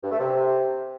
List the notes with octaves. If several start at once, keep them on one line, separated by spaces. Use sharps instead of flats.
G2
A3
C3